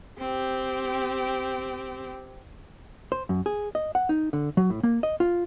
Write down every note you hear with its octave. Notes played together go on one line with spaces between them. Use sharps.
C4 G4
C5
F#2
G#4
D#5
F#5
D#4
D3
F#3
A2
A#3
D#5
F4